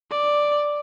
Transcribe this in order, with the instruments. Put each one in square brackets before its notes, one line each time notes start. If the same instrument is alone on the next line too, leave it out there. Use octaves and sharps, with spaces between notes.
[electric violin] D5